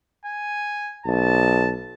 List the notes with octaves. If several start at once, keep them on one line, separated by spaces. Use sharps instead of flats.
G#5
B1 A5